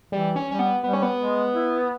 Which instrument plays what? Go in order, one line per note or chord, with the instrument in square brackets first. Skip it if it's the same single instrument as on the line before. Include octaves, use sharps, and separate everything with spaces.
[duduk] E3 [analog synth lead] G3
[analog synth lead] C#4
[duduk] G3 [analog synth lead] C#4
[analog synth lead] B3
[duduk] G3 [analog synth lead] B3
[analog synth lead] C#4
B3
[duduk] G#3
E4